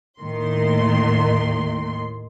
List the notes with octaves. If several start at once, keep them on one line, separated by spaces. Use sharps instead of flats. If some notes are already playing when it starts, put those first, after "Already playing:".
D#2 A2 D#3 C6